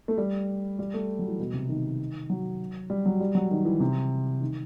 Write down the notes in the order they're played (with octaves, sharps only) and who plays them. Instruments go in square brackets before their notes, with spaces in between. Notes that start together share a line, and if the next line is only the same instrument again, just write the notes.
[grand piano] A3
G3
G3
A3
F#3
E3
B2
C3
D#3
F#3
G3
F#3
G3
F#3
D#3
E3
C3
D#3